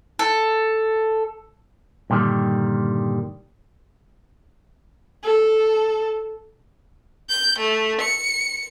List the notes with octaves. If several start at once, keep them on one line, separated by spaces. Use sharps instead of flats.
A4
G2 A#2 D3 D#3 G3
A4
G6
A3
C#7